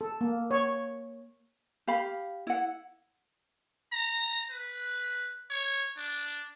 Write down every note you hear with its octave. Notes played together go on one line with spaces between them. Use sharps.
A4
A#3
C#5
G4 F5 B5
E4 F#5
A#5
B4
C#5
D4